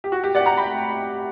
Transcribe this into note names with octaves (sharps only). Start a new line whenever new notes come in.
G4
F#4
G4
D5 F#5
F#5 A#5
G5 B5